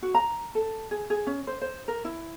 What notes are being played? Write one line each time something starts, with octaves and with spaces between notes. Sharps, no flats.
F#4
A#5
A4
G#4
G#4
C#4
C5
C5
A#4
E4